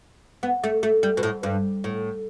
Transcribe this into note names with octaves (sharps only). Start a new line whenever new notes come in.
B3
A3
A3
G3
B2
A2
G2
A2